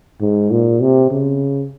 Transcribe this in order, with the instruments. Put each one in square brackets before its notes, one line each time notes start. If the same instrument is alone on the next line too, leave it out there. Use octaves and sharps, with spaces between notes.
[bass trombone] G#2
A#2
C3
C#3